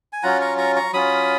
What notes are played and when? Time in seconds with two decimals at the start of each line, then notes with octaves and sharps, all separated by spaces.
0.13 G#5
0.23 F#3 C#4 F4 F#5 A#5
0.41 A#5 C#6
0.58 A#5 C#6
0.76 A#5 C#6
0.93 F#3 C#4 F4 B5 D#6